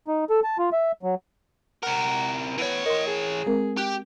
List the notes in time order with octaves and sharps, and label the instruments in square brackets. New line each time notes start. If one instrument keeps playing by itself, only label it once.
[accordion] D#4
A4
A5
F4
E5
F#3
[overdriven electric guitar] C3 A#4 [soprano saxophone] F#5
[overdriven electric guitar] E3 C#5 [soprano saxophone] B3
[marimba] A#4 C6 [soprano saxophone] D#5
[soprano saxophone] G#4
[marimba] G#3 C4 A#4
[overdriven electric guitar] G4 [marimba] F#6